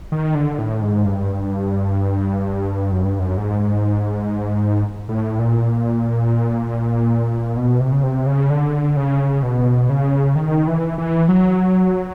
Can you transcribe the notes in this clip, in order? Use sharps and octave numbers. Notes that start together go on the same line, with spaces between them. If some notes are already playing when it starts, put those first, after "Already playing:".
D#3
D3
A2
G#2
G2
F#2
G2
F#2
G#2
A2
A#2
B2
C3
C#3
C3
C#3
D3
C#3
B2
C#3
D#3
E3
E3
F#3